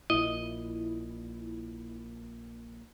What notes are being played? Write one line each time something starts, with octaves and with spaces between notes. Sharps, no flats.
A#1 A#2 E4 D#5